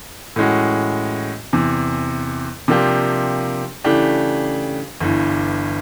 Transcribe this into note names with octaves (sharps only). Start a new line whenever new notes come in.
A2 E3 G#3 C#4 F#4
E2 C3 E3
C3 F3 A#3 D4 G4
C#3 E3 A3 D4 G4
G1 G2 E3